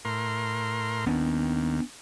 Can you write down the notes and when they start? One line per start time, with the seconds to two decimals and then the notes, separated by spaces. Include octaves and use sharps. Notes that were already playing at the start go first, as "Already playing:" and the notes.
0.05 A2 A#4 C6
1.06 D#2 B3 C#4 D4